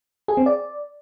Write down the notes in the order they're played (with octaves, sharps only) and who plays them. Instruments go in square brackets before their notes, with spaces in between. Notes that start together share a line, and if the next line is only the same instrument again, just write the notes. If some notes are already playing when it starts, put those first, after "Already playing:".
[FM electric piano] G#4
C4
D5